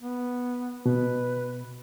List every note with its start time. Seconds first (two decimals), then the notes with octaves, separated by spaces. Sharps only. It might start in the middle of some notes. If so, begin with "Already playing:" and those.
0.01 B3
0.86 B2 B4